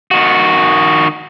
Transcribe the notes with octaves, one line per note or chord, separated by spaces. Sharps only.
D#3 F#4